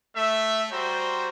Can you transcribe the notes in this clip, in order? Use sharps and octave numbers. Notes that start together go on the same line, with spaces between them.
A3 E5
G3 F#4 C5 G5 A#5